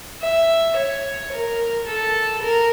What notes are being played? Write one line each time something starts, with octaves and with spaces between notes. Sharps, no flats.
E5
C#5
A#4
A4
A#4